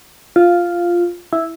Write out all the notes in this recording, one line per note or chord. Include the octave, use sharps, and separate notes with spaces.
F4
E4